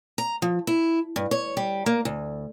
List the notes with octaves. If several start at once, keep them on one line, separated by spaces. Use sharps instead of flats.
A#5
F3
E4
G2
C#5
G3
A#3
D2